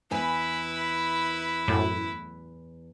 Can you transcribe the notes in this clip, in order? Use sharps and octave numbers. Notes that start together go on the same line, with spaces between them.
E2 E4 B4 G#5
F#2 A2